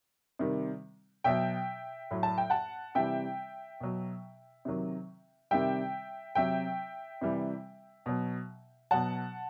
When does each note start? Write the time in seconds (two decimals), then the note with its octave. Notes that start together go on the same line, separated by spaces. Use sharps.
0.39 C3 D#3 G3
1.24 B2 F#3 E5 G5
2.11 A2 F#3
2.23 A5
2.38 G5
2.50 F#5 A5
2.95 C3 E3 G3 E5 G5
3.80 B2 F#3
4.65 C3 D#3 F#3
5.51 C3 D#3 G3 E5 G5
6.35 C3 F#3 E5 G5
7.21 C3 E3 G3
8.06 B2 F#3
8.91 B2 F#3 F#5 A5